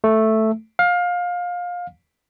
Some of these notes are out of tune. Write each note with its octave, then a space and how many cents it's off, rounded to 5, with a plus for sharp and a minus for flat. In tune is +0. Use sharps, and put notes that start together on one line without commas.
A3 +0
F5 +25